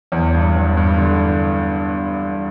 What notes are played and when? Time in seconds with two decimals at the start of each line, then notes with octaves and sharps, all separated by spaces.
0.12 E2
0.35 G2
0.56 E2
0.77 G2
0.98 D3